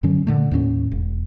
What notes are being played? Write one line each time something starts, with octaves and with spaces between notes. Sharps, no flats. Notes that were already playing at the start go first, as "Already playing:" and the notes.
F#2 D3 F#3 C#4
A#2 D3 A3
D#2 A2 A#3 C#4
E1